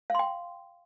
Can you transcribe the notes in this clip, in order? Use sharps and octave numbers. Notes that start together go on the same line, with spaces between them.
F5 G5 C6